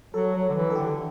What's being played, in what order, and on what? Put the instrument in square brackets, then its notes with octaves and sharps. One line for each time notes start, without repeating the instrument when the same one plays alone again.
[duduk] F#3 [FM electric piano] A4
[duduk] F#3
D3
E3
[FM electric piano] A4
[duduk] D3 [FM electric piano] G4